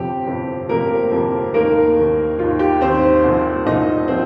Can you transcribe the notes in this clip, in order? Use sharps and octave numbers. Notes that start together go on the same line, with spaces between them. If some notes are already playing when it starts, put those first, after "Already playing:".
Already playing: G1 F2 C3 F3 G4
G1 F2 C3 F3
G1 F2 C3 F3 A#3 A#4
G1 F2 C3 F3
D#2 D#3 A#3 A#4
D#2 D#3
D#2 D#3 F4
G4
D#2 D#3 C4 C5
C2 A#2 F3
C2 A#2 F3 D#4 D#5
A#2 F3 C4 C5